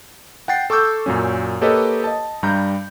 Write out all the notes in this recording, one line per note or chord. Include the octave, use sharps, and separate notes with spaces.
F#5 G5 A6 C7
A4 C#6 D6 E6 G6
F#2 A#2 F#3 C#4
A#3 G4 A4 B4 C#5 D#5
D#5 A5
G2 G3 A#5 G6